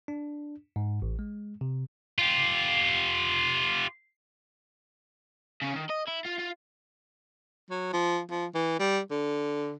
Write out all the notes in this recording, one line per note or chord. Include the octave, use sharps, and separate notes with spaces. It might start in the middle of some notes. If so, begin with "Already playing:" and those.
D4
G#2
A1
G#3
C3
F4 G4
C#3 C#4
D#3
D#5
E4
F4
F4
F#3
F3
F3
E3
G3
D3